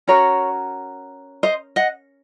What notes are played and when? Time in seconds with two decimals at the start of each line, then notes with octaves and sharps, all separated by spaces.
0.07 C#4 F#4 A#4 C#5
1.43 C5 D#5
1.76 D#5 F#5